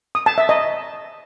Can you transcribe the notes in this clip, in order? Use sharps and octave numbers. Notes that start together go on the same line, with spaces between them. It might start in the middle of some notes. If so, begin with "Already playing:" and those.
D#6
A5
E5
D#5